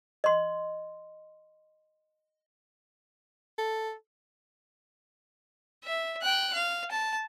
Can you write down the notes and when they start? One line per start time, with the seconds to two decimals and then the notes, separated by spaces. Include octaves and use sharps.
0.24 D#5 C6
3.58 A4
5.84 E5
6.22 G5 F#6
6.54 F5
6.91 A5